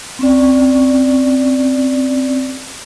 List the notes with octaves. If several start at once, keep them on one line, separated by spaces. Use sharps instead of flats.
C4 C#4 D5